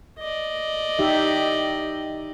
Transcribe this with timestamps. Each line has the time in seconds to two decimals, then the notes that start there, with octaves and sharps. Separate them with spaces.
0.19 D5 D#5
0.99 D#4 G4 E5